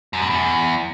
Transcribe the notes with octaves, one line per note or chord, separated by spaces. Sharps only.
F#2
B2
E2